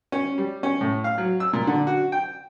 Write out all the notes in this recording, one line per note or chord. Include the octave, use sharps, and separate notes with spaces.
C#4
G3
C#4
A2
F5
F#3
E6
A#2
D3
F#4
G5